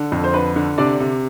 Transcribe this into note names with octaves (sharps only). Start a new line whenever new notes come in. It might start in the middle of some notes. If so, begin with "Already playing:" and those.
Already playing: D3
F2
C5
D3 B4
D3
C3 D4 D5
C3